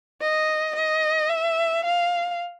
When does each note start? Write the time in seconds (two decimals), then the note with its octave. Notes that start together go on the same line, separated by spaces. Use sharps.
0.21 D#5
0.75 D#5
1.30 E5
1.85 F5